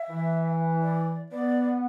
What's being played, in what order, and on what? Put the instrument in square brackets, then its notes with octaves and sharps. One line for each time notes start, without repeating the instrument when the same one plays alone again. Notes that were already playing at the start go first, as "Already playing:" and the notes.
Already playing: [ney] E5
[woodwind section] E3
[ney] D5
[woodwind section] B3 [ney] D5